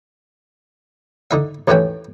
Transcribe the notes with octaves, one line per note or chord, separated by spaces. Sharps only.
D3 D#4 E5
D#2 A2 E3 A3 C#4 G5